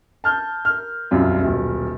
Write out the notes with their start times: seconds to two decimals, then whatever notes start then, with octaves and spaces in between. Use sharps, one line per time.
0.24 A5 F6 G6
0.65 A#4 F6
1.11 E1 C2 F#2 C3 F4
1.40 D#1 B1